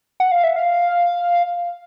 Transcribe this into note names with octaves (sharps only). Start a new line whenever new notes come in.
F#5
F5
E5
F5